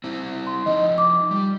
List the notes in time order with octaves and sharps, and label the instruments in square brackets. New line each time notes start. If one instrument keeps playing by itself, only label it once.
[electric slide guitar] C4 E4
[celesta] C6
[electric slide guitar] F3 D#4 [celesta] D#5
[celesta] D6
[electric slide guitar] G3 G4